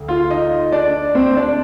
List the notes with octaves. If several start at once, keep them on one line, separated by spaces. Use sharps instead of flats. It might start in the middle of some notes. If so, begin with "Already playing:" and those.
Already playing: D2
F4 F5
D#4 D#5
D4 D5
C4 C5
D4 D5